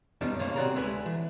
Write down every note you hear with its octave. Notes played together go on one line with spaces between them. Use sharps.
F#2 D#3 G3 B3 D4
A2 C#3 A#3 C#4 C5 F5
C3 C4 F#4 G#4 D5 A#5
D2 G#3 A3 B4 G#5
E3